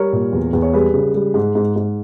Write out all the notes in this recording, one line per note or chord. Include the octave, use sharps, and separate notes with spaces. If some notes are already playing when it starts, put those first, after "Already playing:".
Already playing: G3 A#4 C#5
A#2
E2
E2
C#5
G3 G#4 B4
C#3
G3
G#2
G#2
G#2